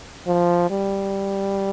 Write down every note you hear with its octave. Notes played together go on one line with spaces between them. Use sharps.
F3
G3